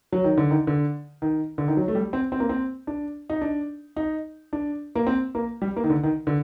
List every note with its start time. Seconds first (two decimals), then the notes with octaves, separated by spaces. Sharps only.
0.12 F#3
0.24 D#3
0.37 D3
0.51 D#3
0.67 D3
1.22 D#3
1.58 D3
1.68 D#3
1.77 F#3
1.88 A3
1.95 G3
2.13 C4
2.32 C4
2.40 A#3
2.49 C4
2.87 D4
3.30 D#4
3.41 D4
3.96 D#4
4.53 D4
4.95 A#3
5.07 C4
5.35 A#3
5.62 G3
5.76 A#3
5.84 D#3
5.90 D3
6.03 D#3
6.27 D3